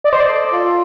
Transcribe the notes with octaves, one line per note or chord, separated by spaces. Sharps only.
D5 D#5
C5
D5
A4
F4